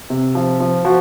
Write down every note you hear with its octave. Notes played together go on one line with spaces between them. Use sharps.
C3
F3
F3
F3 F#4